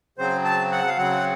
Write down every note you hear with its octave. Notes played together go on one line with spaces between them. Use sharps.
C#3 F#3 C4 C5
A5
F#5
F5
C#3 F#3 C4 F#5